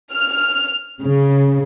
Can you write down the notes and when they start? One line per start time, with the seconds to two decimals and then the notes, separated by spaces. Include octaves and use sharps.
0.13 F6
1.01 C#3